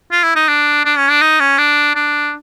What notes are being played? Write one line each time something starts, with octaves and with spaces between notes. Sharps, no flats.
F4
E4
D#4
D4
D4
C#4
D4
D#4
C#4
D4
D4